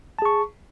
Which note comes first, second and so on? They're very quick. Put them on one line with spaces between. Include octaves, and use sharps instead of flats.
A5 G#4 C#6